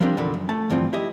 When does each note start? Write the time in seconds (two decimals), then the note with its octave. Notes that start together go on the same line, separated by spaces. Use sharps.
0.01 F3 G3 A#3 C4 D4
0.17 E2 A#2 D3 B5
0.34 F#2
0.49 A3 A5
0.70 D2 G2 E3 F3 C4
0.93 E4 G4 D#5